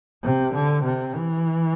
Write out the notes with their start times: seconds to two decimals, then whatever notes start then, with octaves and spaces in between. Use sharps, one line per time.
0.23 C3
0.54 D3
0.84 C3
1.15 E3